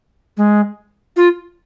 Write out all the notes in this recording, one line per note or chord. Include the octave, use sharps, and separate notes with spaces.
G#3
F4